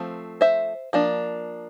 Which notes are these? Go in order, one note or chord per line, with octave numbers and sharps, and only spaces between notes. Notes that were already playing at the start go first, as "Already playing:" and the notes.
Already playing: F3 A3 C4
C5 E5
F3 A#3 D4